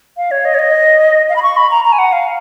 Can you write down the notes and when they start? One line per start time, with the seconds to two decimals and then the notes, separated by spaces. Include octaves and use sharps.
0.17 F5
0.31 C#5
0.45 D#5
0.54 C#5
0.59 D#5
1.29 F5
1.36 B5
1.43 C#6
1.57 B5
1.71 A#5
1.85 A#5
1.92 G#5
1.99 F#5
2.13 F5